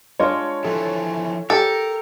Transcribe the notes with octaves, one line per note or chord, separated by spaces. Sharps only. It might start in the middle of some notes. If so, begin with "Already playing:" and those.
G#3 D4 F4 C#5
E3 F3 A4
G4 A4 A#4